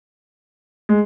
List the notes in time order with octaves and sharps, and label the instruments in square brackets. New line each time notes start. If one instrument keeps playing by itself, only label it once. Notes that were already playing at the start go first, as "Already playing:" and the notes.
[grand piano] G#3